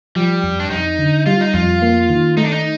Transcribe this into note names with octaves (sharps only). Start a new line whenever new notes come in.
F3 G3
F2
D4
F2 D#4
D3
G3 F4
D#4
F2 F4
A#3
D#3
A3 D#4
D4
D#4